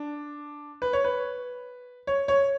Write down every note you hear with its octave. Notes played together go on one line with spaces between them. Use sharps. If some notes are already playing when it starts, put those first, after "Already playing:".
Already playing: D4
B4
C#5
B4
C#5
C#5